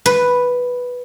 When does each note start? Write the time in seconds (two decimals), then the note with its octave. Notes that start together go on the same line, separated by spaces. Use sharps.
0.06 B4